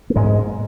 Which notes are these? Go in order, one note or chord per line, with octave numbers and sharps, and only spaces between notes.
A#3
G#2 G#3